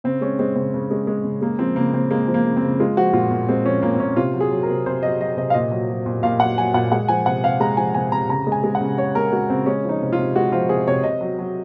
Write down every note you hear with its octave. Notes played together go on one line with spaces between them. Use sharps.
C#3 C4
G#3 C#4
G#3 C4
C#3 C4
C#3
G#3
G#3
C#3
G#3 A#3
F3 C4
C#3 A#3
C#3 C4
G#3 A#3
F3
A#3
C#3
C4
C#3
G#3 F4
F3 F#4
A#2 F4
A#2
G#3 C4
F3 C#4
A#2 A#3
C4
A#2 C#4
C3 F4
F#3
G#4
F#3
A#4
C3
C3 C5
F#3 D#5
F#3 D#5
C3 D#5
F5
A#2 D#5
F#3
F#3
A#2
A#2 F5
F#3 F#5
F#3 G#5
A#2 F#5
G#3 F#5
F3 G#5
C3 F#5
C3 F5
G#3 A#5
F3 G#5
C3 G#5
C3 A#5
C#3 A#5
G#3
G#5
G#3
F#5
C#3
C#3 C#5
G#3 A#4
G#3 F#4
C#3 C4
G#3 C#4
F3 D#4
C3
F4
C3
G#3 F#4
F3 F4
C3 G#4
C3 C#5
C3 D#5
F#3
F#3